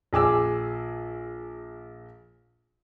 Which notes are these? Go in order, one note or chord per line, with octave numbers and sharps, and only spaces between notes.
A#1 G#4 D6 E6